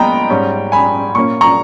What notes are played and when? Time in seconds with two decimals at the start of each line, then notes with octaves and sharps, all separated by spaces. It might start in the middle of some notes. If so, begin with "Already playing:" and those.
Already playing: A#2 G#3 B3 D#5 G5 A#5 B5
0.30 G#2 G3 C#4
0.72 G#5 B5
1.15 A#2 A#3 C#4 C#6
1.41 A#5 C#6